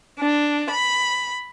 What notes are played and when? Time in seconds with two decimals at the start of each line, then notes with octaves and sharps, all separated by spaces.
0.20 D4
0.71 B5